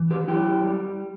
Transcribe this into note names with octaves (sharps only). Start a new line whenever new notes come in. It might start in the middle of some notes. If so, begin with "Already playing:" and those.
Already playing: E3
G4 B4
F#2 E4 G4
G3